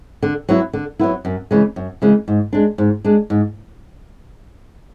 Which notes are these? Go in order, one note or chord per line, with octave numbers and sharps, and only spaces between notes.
D3
F#3 B3 E4
D3
F#3 B3 E4
F#2
C#3 E3 G#3
F#2
C#3 E3 G#3
G#2
G#3 D4
G#2
G#3 D4
G#2